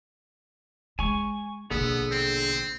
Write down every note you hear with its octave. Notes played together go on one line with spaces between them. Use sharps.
G#3 G#5 C#6
A#1 B2 D3 B3 G#4 A4
C4